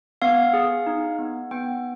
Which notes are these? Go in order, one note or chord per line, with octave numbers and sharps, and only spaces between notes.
B3 F5
G#4
D#4
B3
B3 G5